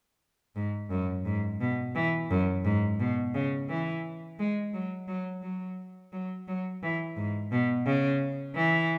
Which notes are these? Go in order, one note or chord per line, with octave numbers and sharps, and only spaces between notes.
G#2
F#2
G#2
B2
E3
F#2
G#2
B2
C#3
E3
G#3
F#3
F#3
F#3
F#3
F#3
E3
G#2
B2
C#3
E3